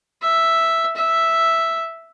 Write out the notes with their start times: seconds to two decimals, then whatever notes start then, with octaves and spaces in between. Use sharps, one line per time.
0.22 E5
0.96 E5